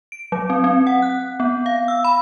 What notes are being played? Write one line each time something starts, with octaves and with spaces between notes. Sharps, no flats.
D7
F#3
C4
C4
F#5
F#6
B3
F5
E6
B5